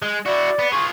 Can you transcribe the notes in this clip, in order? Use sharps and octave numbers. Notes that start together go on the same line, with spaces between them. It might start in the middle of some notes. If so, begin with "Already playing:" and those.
G#3
E4 F#4 D5
B3
F4 G#4 C#6